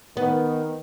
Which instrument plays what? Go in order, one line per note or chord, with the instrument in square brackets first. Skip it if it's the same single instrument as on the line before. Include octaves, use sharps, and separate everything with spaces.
[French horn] D#3 [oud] B3